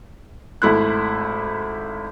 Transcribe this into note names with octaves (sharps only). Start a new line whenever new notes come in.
G#1 A3 E4 C6 F#6